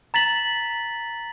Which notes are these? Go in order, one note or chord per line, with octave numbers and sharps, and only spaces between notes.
A#5 A6 B6 F#7